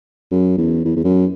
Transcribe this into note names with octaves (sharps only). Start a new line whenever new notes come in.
F#2
E2
E2
E2
F#2